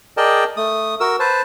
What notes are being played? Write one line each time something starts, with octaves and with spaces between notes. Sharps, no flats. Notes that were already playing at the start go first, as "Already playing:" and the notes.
G#4 A#4 D5 D#5 G5 A5
A3 D#6
F#4 A#4 E6
B4 C5 A5